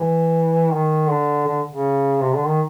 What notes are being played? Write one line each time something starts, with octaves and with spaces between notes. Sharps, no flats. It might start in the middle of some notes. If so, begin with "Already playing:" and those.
Already playing: E3
D#3
D3
D3
C#3
C3
D3
D#3